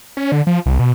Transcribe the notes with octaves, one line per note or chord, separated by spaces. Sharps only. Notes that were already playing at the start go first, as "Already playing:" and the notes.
C#4
D3
F3
C2
B2